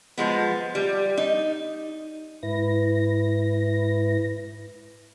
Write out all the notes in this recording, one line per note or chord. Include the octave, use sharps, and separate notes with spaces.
F3 G#3 B3
G3
D#4
G#2 E4 B4 A#6